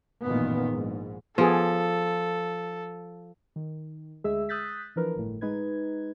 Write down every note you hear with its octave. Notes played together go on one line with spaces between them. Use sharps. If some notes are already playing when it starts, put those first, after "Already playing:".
A1 F#2 A#2 D#3 B3
A#1 G#2
F3 B3 G#4 A4
D#3
D2 G#3 G#4 E5 G#5 E6
D#6 E6 F#6 G6 A6 B6
E3 F3 D4 A#4 B4
G1 A2
G#3 D#4 B4 G#6